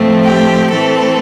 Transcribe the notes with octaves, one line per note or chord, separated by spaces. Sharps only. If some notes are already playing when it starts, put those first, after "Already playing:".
Already playing: A2 F3 A3 C4
G4
E3 A3 C4 A4